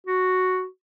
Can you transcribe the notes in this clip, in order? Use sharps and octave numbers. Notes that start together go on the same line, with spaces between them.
F#4